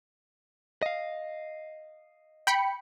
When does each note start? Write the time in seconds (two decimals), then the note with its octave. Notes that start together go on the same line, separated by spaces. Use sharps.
0.83 D#5 F5
2.47 G5 B5 C#7